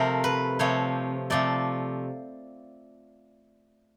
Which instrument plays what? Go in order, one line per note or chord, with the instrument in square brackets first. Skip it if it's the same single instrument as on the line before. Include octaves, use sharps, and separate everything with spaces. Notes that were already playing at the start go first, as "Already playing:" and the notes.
Already playing: [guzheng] C3 F3 A3 A#4
B4
C3 F3 A3 C#5
C3 F3 A3 D5